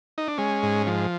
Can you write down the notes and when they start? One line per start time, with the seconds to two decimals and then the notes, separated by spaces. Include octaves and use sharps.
0.18 D#4
0.28 D4
0.38 G#3 C#4
0.63 G#2
0.87 F3